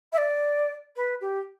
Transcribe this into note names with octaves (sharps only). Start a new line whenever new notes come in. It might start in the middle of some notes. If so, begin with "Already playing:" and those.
E5
D5
B4
G4